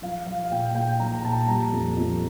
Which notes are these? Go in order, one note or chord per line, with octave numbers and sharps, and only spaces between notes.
F3 F5
F3 F5
F5
A#2 G5
A#2 G5
F3 A#5
A#5
A#2 A5
G3 A#5
F2
F2